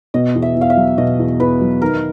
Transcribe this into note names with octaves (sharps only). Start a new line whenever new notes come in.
B2 D#5
E2
E5
E2
F5
E5
F#3
B2 D#5
E2
E2 B4
F#3
D#3 A#4